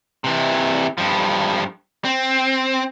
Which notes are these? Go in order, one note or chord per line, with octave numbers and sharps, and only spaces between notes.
C3 E3
G2 F3
C4